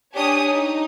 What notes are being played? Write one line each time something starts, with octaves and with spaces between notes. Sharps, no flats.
D4 G4 C#5 G#5 D#6
D#4